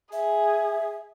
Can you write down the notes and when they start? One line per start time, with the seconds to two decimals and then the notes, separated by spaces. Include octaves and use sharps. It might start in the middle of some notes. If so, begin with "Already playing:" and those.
0.12 G#4 E5